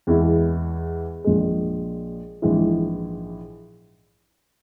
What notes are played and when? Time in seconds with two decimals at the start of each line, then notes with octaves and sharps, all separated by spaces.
0.07 E2 E3 G#3 E4
1.24 A#1 A#2 G#3
2.42 A#1 G#2 E3 G#3 E4